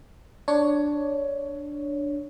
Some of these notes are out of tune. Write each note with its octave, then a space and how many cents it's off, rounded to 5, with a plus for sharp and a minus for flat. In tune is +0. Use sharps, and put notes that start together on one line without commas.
D4 +0 C#5 +10